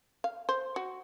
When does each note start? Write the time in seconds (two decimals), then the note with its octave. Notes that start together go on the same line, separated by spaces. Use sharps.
0.24 F5
0.49 C5
0.76 F#4